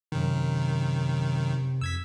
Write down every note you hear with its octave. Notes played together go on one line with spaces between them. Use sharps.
F#2 C3 D#3
F2 E6 G#6 B6